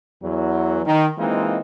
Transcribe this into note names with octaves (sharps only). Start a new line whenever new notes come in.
E2 E3 F#3
D#3
E3 G#3 A#3 C4 D#4 F4